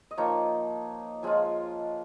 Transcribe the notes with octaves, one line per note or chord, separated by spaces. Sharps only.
D#5
F3 A#3 D#4 C#5
F3 G#3 C#4 F4 G#5